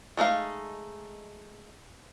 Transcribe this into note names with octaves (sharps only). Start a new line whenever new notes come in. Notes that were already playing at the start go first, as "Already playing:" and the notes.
G#3 A3 D#4 F5